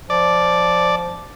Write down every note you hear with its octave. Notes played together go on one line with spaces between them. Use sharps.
F3 D5